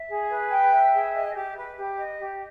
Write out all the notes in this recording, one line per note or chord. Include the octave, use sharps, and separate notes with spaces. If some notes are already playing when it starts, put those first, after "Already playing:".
Already playing: E5
G#4
B4
G5
E5
G#4
D#5
G4
B4
G4
D#5
G4